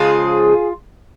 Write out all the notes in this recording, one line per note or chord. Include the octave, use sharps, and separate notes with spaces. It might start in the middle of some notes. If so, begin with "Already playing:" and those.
Already playing: C#3 F3 G#3 F4 G#4